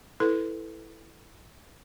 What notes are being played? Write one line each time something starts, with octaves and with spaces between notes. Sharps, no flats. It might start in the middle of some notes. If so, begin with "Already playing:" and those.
E4 A4 B4